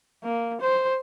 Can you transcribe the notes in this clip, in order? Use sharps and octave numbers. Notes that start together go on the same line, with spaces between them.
A#3
C5